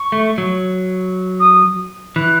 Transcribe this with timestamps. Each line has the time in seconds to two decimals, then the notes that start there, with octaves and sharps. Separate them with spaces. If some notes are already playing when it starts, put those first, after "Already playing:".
Already playing: C#6
0.12 A3
0.38 F#3
1.39 D#6
2.16 E3 F#6